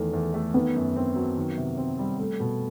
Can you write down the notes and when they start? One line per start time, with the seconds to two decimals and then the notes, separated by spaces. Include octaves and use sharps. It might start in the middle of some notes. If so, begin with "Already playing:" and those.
Already playing: E2 D#3 A3
0.13 E2
0.34 A3
0.54 D#3 B3
0.75 F#2
0.96 C4
1.16 F#3
1.37 D#3
1.57 C3
1.78 C4
1.99 G3
2.19 G3 A3
2.40 B2